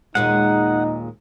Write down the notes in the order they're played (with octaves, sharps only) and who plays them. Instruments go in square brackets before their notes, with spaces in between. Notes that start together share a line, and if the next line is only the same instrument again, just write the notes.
[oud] D#2 A#2 G#3 [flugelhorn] D#4 [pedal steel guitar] F#5